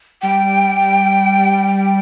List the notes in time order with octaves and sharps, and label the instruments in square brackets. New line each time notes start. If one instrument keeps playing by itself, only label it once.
[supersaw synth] G3 [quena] G5
[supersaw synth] G3
G3